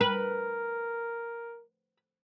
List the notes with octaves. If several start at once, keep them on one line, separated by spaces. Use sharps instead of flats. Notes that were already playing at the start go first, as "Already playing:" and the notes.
A#4 B4